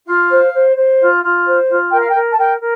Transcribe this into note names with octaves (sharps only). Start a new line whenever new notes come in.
F4 F5
C5
C5
C5
F4
F4
C5
F4
A#4 G5
F5
G5
A#4
A5
A#4 G5
A#4